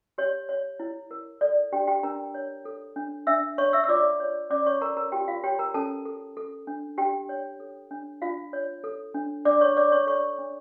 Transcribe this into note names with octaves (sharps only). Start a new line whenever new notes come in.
G4 C#5
C#5
E4
A#4
A4 D5
D4 G4 G5
G4 G5
D4 A#4 A#5
C#5
A4
D4
D4 E5 E6
C#5 C#6
E5 E6
E6
F4 D5 D6
C#5
C#4 D5 D6
C#5 C#6
A4 A#4 A#5
A#4 A#5
F4 G4 G5
F4 F5
G4 C#5 G5
A#4 A#5
C#4 A4 A5
A4
A4
D4
D4 G4 G5
C#5
A4
D4
D4 F4 F5
C#5
A4
D4
D4 D5 D6
C#5 C#6
C#5 D5 D6
C#5 C#6
A4 C#5 C#6
D4